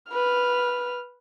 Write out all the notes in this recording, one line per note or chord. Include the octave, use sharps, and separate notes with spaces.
B4 F6